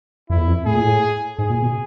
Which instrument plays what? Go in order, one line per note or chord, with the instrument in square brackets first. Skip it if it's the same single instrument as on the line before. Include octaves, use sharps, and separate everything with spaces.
[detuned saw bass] F2 [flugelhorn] E4
[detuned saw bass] E2
F2
[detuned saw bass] A2 [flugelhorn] G#4
[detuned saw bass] A#2
A2
[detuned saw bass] G#2 [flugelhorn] G#4
[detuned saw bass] A#2
B2